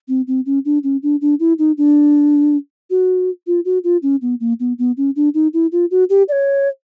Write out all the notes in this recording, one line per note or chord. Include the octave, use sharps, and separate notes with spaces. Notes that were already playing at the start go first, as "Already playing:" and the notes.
C4
C4
C#4
D4
C#4
D4
D4
E4
D#4
D4
F#4
F4
F#4
F4
C#4
B3
A#3
B3
B3
C#4
D4
D#4
E4
F4
F#4
G4
D5
C#5